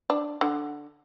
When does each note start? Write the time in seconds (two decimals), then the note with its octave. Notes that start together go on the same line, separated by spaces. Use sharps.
0.10 D4
0.41 D3